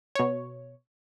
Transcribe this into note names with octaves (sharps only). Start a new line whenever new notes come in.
B2 C#5